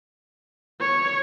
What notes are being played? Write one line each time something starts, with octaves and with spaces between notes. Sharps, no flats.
C#5